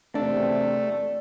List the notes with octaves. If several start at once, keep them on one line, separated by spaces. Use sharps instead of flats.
E2 C3 A3 D4